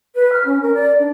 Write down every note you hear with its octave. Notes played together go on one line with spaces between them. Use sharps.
B4
F6
C#4
A#4
D5
D4